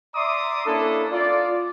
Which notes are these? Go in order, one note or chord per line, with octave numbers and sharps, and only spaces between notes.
D5 E5 A#5 C6 D6 D#6
A#3 C#4 D4 E4 A4
F4 D5